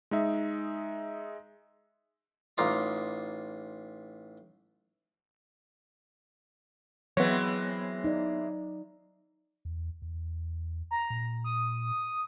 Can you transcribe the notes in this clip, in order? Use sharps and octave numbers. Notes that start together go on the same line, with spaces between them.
G#3 D#4 E5
A1 D#4 F4 D6
E3 F#3 G#3 B3 C4 C#5
D#4 D5
E2
E2
A#5
A#2
D#6